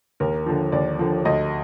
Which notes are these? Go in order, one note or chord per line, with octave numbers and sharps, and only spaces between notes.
D#2 A#4
D3 F3
D#2 D5
D3 F3
D2 D#5